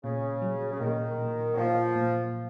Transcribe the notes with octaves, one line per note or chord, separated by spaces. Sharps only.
A#2 C#3
F#3
C#3
A#2 D#3
A#2
F#3
A#2 F3
A#2